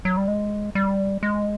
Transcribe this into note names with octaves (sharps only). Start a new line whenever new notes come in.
F#3
G3
G#3
G3
G#3